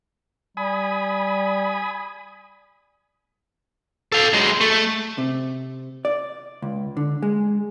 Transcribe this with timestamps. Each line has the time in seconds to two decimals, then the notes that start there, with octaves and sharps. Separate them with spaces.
0.57 G3 G#5 B5 D#6
4.12 A4 F5
4.33 F#3 G#3
4.61 A3
5.18 C3
6.05 D5
6.62 C#2
6.97 D3
7.23 G#3